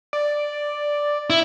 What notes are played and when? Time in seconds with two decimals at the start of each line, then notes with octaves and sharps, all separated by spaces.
0.13 D5
1.30 E4